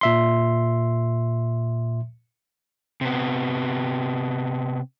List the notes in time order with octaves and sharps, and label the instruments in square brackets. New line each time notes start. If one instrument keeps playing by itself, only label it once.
[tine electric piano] A#2 E5 C6
[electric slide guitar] C3 B3